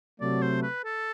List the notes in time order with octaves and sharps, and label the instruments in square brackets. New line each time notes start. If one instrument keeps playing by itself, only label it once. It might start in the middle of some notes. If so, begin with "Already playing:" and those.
[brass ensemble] C3 F#3 A3 [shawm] D5
[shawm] C5
B4
A4